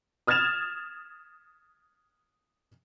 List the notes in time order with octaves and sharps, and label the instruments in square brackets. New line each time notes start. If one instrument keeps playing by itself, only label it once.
[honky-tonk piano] D#6 F6 G#6 A6 E7 F7